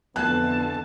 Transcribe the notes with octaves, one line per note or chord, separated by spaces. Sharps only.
F2 D3 E3 B3 A5 F#6